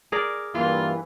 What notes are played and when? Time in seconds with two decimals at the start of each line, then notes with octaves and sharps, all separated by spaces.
0.12 G#4 A#4 D5
0.55 G2 E3 A#3 F4